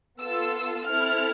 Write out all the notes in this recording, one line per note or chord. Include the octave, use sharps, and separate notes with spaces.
B3 F4 A4 E6
C4 E4 A4 F6